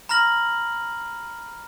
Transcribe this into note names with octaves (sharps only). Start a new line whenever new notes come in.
A#5 B5 F6 A#6 F#7